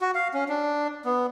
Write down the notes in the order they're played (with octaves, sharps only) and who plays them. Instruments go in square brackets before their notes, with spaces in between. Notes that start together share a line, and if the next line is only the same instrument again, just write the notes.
[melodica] F#4
F5
C#4
D4
B3